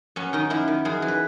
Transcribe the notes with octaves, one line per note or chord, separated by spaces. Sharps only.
F#2 C#4
D#3 D#4
F#2 E4
D#3
F#2 G#4
E3
B4